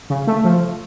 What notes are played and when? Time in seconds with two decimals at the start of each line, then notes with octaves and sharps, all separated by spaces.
0.10 C#3
0.27 A3
0.45 F3